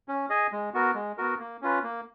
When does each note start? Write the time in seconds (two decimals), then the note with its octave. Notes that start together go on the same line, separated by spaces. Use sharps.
0.08 C#4
0.29 G#4 D#5 G#5
0.52 G#3
0.74 B3 F#4 A#4
0.95 G#3
1.18 B3 F#4 A#4
1.39 A#3
1.62 C#4 F4 B4
1.83 A#3